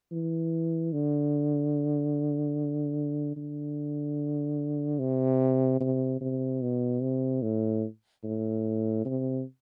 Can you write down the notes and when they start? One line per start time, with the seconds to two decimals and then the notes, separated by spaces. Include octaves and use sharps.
0.12 E3
0.93 D3
3.36 D3
4.99 C3
5.80 C3
6.21 C3
6.62 B2
7.02 C3
7.42 A2
8.24 A2
9.05 C3